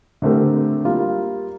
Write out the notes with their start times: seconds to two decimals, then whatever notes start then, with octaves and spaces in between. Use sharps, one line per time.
0.22 D3 A3 C4 G4 A#4
0.84 G3 A#3 F4